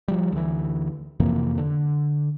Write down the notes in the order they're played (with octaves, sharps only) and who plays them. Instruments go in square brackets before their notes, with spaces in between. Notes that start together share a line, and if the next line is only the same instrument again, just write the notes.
[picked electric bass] F3 G3
D2 E3
F2 C3 E3 A#3
D3